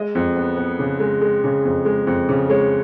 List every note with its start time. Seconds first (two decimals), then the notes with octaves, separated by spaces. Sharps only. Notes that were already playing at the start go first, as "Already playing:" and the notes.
Already playing: G#3 D#5
0.15 F2
0.36 B3
0.57 B3
0.79 C#3
1.00 G#3
1.21 G#3
1.44 C#3
1.65 F2
1.85 G#3
2.07 F2
2.29 C#3
2.50 G#3 C#5